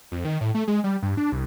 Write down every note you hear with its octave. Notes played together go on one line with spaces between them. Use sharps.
F2
D#3
A2
A3
G#3
G3
G2
D4
C2